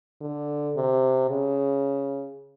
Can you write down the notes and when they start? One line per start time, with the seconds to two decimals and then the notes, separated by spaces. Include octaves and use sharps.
0.21 D3
0.76 C3
1.30 C#3